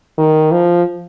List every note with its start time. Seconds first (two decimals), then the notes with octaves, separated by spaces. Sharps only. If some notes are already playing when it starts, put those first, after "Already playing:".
0.18 D#3
0.52 F3